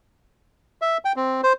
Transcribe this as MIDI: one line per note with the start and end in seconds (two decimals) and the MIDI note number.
0.82 0.97 76
1.05 1.12 79
1.16 1.41 60
1.43 1.53 72